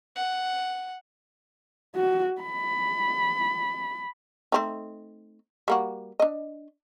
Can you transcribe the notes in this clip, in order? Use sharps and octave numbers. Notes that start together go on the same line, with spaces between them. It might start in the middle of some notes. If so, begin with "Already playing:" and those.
F#5
F#4
B5
A3 C4 D#4
G3 A#3 F#4
D4 D#5